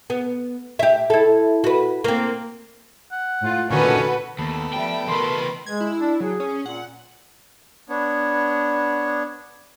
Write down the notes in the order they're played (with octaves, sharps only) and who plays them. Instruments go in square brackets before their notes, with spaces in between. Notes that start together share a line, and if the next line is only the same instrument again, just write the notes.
[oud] B3
G4 E5
E4 A4
F#4 B4
A#3 C4
[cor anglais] F#5
[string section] A2 F4
[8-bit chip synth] A#2 D3 D#3 [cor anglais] C#4 [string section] F#4 A4 B4
[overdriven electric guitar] D#2 [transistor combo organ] A3 B3
[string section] F3 G3 E5 [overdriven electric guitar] G5
[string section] B2 B4 B5 [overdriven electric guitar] E3 A#4 [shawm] C6
[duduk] G#3 [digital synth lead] G#6
[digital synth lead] E4
[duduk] D4
[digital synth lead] F#3 [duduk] G#4
[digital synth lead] C#4
[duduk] A#2 [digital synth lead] F#5
[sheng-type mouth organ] B3 D4 C#5